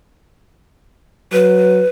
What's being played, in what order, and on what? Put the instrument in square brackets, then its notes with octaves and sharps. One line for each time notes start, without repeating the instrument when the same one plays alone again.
[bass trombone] F#3 [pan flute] B4